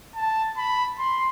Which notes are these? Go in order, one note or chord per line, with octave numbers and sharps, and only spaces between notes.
A5
B5
C6